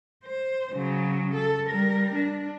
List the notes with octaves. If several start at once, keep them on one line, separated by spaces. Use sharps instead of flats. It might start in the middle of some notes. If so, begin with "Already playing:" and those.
C5
C#3 F#3
A4
G3 A#4
D4